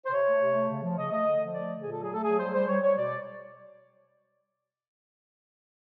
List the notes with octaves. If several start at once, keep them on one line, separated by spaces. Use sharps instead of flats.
C5
C3 C#5
A3
C3
A3
C#3
F3
C#3 D#5
A3 D#5
D3
F3
A3 D5
D3
A#2 G#4
F#3 A4
G#4
A3 A4
F#3 G#4
G3 C5
G3 C5
G3 C#5
G3 C#5
B2 D5